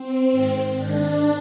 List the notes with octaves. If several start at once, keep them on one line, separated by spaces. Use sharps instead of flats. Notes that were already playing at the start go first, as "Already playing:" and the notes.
Already playing: C4
G#2 D#3
G#2 D#3 D4